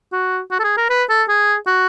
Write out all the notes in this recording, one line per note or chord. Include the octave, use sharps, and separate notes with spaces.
F#4
F#4
A4
G#4
A#4
B4
A4
G#4
F#4